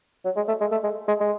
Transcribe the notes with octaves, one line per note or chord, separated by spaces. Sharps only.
F#3
G#3
A3
G#3
A3
G#3
G#3
G#3